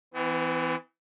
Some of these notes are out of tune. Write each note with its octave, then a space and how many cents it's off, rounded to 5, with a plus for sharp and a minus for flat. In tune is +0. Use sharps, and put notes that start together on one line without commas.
E3 -5 B3 +45